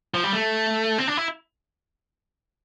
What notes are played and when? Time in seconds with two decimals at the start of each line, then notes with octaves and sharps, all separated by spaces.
0.14 F3
0.24 G3
0.33 A3
0.98 C4
1.08 D4
1.17 E4